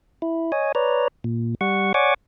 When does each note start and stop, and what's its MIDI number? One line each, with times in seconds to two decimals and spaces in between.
0.22 0.52 64
0.52 0.72 73
0.52 0.72 75
0.52 0.72 80
0.75 1.08 71
0.75 1.08 73
0.75 1.08 74
0.75 1.08 82
1.24 1.55 46
1.61 1.93 55
1.61 1.93 78
1.61 1.93 85
1.94 2.14 73
1.94 2.14 74
1.94 2.14 78
1.94 2.14 80
1.94 2.14 85
1.94 2.14 86